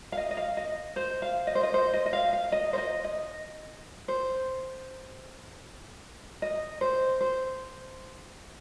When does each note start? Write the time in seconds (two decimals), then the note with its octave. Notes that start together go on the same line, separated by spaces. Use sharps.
0.12 F5
0.17 D#5
0.31 D#5
0.37 F5
0.57 D#5
0.96 C5
1.22 F5
1.47 D#5
1.55 C5
1.63 D#5
1.74 C5
1.93 D#5
2.06 D#5
2.13 F5
2.33 F5
2.52 D#5
2.73 C5
2.78 D#5
3.04 D#5
4.08 C5
6.42 D#5
6.81 C5
7.21 C5